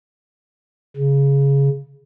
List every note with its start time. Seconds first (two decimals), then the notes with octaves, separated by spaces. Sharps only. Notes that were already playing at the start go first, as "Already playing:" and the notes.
0.96 C#3